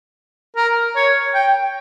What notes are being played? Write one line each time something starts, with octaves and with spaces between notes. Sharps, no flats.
A#4
C#5
G5